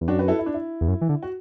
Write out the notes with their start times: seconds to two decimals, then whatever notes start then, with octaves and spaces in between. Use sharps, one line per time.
0.01 E2
0.08 F#2 D4 F#4
0.19 F#4 B4
0.28 E4 A4
0.39 E4
0.46 D4
0.54 E4
0.81 E2
0.88 F#2
1.01 E3
1.09 D3
1.23 F#4